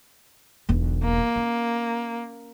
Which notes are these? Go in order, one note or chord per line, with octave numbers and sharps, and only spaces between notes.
E1 B1
A#3
C#4